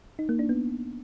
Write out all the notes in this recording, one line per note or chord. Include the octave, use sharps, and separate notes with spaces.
D#4
A#3
D4
B3